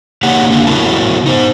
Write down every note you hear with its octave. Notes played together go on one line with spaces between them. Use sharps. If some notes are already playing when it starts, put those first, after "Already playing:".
C#3 A#3 D#4 G4 C#5 F#5
D3 A#3
C#3 F#3 B3 E4 A#4 A5
D#4 C5